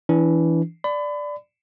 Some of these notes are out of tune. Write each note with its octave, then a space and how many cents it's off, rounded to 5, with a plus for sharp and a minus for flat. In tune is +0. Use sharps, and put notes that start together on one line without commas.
E3 +0 D4 -30
D5 +0 B5 +35